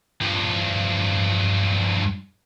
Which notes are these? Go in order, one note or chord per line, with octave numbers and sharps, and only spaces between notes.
G2 F3